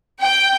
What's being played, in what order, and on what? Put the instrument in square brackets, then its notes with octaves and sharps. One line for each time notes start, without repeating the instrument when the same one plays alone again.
[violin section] G5